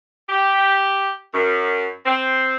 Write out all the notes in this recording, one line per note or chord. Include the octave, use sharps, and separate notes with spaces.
G4
F#2
C4